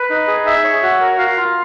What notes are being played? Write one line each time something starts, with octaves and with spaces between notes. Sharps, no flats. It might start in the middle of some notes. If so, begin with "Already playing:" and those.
Already playing: B4
D#4
G#4
E5
C#5
F#4
A#4
F5
F4